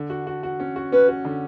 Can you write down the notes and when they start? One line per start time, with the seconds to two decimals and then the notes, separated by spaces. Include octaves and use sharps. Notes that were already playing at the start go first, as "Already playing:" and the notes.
Already playing: D3
0.10 F#4
0.27 F#4
0.43 F#4
0.60 C#4
0.76 F#4
0.92 C#4 B4
1.08 F#4
1.25 D3